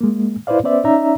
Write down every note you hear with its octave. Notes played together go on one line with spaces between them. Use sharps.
G#3 A#3
E4 B4 C5 D5 F5
B3 C#4 B4 C5 D5 E5
C#4 D#4 D5 E5 A#5